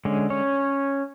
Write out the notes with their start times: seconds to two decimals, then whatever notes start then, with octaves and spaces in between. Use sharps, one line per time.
0.05 D3 G#3 C#4
0.30 C#4 C#5